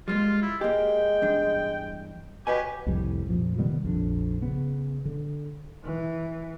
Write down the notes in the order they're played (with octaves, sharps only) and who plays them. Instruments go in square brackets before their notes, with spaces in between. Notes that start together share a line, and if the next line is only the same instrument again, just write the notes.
[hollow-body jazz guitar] G3 G#3 A#3 [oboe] F4
[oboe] E4
[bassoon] G#3 [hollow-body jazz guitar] A#3 G4 [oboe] G5
[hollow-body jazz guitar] E2 G2 D4
[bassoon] B2 [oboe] G4 [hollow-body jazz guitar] B4 C#5 G#5
[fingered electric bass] C2 F2 A2 G3
F2 A#2 F3
C3 D#3 G3 B3
A#1 F2 D4
C#3 B3
D3
[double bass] E3